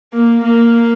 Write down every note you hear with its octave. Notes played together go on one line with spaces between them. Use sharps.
A#3
A#3